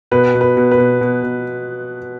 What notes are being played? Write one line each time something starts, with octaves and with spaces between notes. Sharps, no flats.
B2 B4
B2
B4
B2
B4
B2
B2
B2